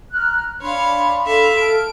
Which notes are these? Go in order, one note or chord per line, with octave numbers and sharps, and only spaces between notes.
A#5 F6 F#6
D4 C#5 F5 B5 C6
A4 E5 F5
A5 F6 D7